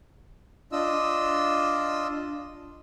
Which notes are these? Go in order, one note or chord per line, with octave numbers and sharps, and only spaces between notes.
D4 F4 D#5 E6